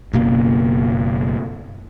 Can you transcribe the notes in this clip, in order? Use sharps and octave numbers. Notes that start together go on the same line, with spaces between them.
F#1 B2 A#3